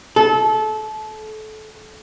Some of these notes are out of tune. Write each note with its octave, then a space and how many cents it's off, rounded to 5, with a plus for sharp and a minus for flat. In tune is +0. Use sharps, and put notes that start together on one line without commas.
A4 -25